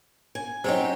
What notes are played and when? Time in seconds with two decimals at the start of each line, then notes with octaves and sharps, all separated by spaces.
0.35 G#5
0.64 F#3 C4 C#4 D#4 G4 C5